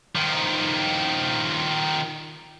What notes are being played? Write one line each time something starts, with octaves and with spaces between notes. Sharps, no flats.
D#3 F3